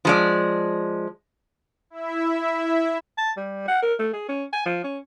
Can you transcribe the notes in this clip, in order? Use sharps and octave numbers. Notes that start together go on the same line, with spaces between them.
F3 G#3 D5
E4 E5
A5
G3
F#5
A#4
A3
G#4
C#4
G#5
F3
C#4